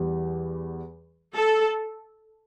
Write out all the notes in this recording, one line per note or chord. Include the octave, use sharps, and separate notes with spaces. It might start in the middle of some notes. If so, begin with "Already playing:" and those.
Already playing: E2 E3 G3
A4